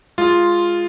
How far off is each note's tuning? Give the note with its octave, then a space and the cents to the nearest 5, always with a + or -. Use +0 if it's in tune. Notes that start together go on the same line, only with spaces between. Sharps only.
G#3 +0 F4 +0